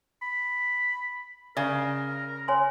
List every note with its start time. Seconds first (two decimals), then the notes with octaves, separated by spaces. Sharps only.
0.22 B5
1.57 C#3 A#4 D5
2.48 C#5 G#5 C6